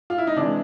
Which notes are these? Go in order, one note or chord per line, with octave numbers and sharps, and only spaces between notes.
F4
E4
D#4
C3 E3 G#3 D4